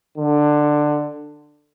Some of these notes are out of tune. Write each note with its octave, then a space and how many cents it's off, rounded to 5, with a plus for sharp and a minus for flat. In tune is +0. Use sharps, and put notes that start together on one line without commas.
D3 +15